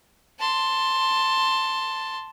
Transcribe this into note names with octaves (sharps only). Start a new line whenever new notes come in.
A5 C6